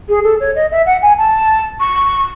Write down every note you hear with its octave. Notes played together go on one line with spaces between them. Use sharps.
G#4
A4
C#5
D#5
E5
F#5
G#5
A5
C#6